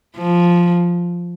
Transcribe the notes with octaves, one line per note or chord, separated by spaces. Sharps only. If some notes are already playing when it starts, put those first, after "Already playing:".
F3